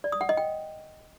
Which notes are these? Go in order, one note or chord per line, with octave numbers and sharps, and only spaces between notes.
D5
D#6
F#5
D#5
G5